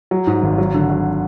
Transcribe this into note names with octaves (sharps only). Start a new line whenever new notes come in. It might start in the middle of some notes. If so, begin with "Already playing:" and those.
F#3
G#2
G#1
F#3
D3
F#3